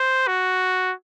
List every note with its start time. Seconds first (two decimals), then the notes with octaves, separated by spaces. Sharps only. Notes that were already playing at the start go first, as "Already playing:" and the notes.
Already playing: C5
0.27 F#4